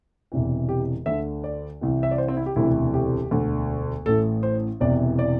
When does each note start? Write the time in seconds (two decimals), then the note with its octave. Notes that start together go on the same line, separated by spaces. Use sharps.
0.32 E1 E2 C3 E3
0.69 G4
1.06 D2 D3 E5
1.44 D5
1.81 C2 C3 E3
2.03 E5
2.11 D5
2.18 C5
2.28 C4
2.37 E4
2.46 G4
2.56 E1 D2 C3 E3 E4
2.94 G4
3.31 E1 D2 D3
4.06 A1 A2 E3 A4
4.43 C5
4.80 E1 E2 C3 E3 D5
5.19 D5